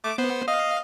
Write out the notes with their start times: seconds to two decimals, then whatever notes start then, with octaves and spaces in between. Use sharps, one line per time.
0.04 A3 D6
0.18 B3 C5
0.48 D#5 F5